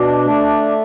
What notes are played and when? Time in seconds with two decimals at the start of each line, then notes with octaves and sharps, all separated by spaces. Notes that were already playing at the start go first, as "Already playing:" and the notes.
Already playing: B2 D4
0.25 A3